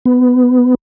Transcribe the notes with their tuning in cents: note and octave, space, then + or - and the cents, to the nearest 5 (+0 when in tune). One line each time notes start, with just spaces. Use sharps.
B3 +15